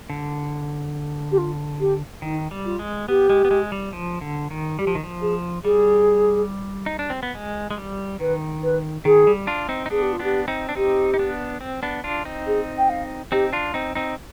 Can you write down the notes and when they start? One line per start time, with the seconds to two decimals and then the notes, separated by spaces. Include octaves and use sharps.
0.10 D3
1.32 G4
1.38 F4
1.80 G4
2.22 D#3 D#4
2.51 G3
2.65 F4
2.79 G#3
3.08 B3 G4
3.30 G#3
3.45 B3
3.51 G#3
3.72 G3
3.93 F3
4.21 D3
4.51 D#3
4.79 G3 G4
4.87 F3
4.95 D#3
5.04 F3
5.21 G#4
5.64 G3 G#4
6.86 D#4
6.99 D4
7.10 C4
7.23 B3
7.35 G#3
7.71 G#3
7.78 G3
8.20 D#3 B4
8.63 B4
9.05 D#3 G#4
9.27 G3
9.47 D4 F4
9.69 C4 D#4
9.86 D#4
9.90 B3 D4 G#4
10.02 G4
10.12 F4
10.19 B3 D4 G4
10.48 C4 D#4
10.69 D4
10.75 C4 D#4 G4
11.14 D#4
11.19 B3 D4
11.61 C4
11.83 B3 D4
12.04 D4 F4
12.25 C4 D#4
12.47 G#4
12.78 G5
12.89 F5
13.32 C4 D#4 G4
13.53 D4 F4
13.74 C4 D#4
13.95 C4 D#4